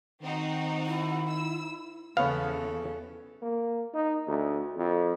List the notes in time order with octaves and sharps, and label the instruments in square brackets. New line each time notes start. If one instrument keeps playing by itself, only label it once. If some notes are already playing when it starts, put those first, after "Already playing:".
[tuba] D#3 [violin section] C4 D#4 F#4
[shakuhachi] E4
[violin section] E6
[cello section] E2 C#3 [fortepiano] B3 C#4 [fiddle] A4 [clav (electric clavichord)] F5
[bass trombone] A#3
D#4
D2
F2